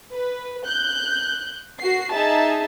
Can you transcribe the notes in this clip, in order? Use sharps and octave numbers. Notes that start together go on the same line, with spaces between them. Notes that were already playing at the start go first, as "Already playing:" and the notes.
B4
F#6 G6
F#4 C7
D#4 G#4 E5 A5